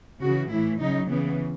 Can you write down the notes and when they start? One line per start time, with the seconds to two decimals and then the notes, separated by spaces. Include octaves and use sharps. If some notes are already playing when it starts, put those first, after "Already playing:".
0.21 C#3 E3 F#4
0.50 A2 E3 E4
0.79 C#3 F#3 D#4
1.09 C#3 E3 B3